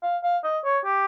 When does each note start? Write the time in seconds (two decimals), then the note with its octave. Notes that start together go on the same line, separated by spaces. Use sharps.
0.03 F5
0.23 F5
0.44 D#5
0.64 C#5
0.85 G4